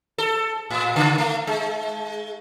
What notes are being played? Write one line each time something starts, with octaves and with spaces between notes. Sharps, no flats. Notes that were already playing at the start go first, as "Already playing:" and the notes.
A4
A2
C#3
A3
G#3